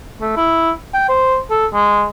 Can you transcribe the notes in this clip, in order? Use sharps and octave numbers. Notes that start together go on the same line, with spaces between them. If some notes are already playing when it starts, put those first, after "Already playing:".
A3
E4
G5
C5
A4
G#3